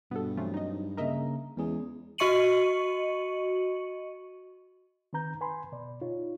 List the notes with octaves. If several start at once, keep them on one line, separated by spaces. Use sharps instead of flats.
G2 B2 B3 A4
E3 F#3 A3 C4 F4
D#4 D#5
C#3 A#3 A#4 D#5 E5 A#5
E2 G#3 C#4 G#4
F#4 D#5 C#6 C#7 D#7 F#7
D#3 C4 B4 A#5 G6
B4 G#5 B5 C6
B2 D5
D#4 F4 C#5